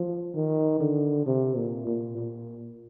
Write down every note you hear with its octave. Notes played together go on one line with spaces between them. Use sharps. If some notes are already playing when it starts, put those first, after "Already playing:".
Already playing: F3
D#3
D3
C3
A#2
A#2
A#2